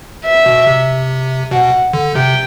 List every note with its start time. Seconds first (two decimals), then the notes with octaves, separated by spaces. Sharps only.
0.24 E5
0.46 B2
0.67 C3
1.51 B2 F#5
1.93 D3
2.15 C3 G5